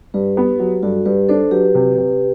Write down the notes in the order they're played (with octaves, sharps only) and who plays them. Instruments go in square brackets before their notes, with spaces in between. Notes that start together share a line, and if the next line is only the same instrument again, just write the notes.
[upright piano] G2 [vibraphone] G4 B4
[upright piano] B3
F#3
[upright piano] G2 [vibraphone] F#4 A4
[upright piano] G2 [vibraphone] G4 B4
[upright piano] D4 [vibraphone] A4 C5
[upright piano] F#3 [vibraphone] G4 B4
[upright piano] C3
C3